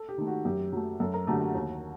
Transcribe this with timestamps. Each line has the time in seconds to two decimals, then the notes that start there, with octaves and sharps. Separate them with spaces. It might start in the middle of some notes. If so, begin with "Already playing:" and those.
Already playing: A4
0.09 G4
0.18 D#3 A3
0.27 F#4
0.45 F#2 G4
0.73 F#3 A3
1.00 F#2 A4
1.14 A#4
1.27 D3 F#3 A3 G4
1.41 F#4
1.55 D#2